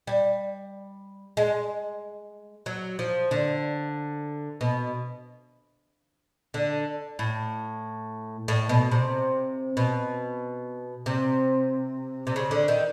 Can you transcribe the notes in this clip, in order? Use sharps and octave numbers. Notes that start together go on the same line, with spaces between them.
G3
G#3
F#3
F3
D3
B2
D3
A2
A2
B2
C3
B2
C3
C3
C#3
D3
D#3